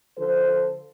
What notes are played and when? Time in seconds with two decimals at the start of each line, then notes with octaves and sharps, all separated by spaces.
0.17 D3 F3 A4 C5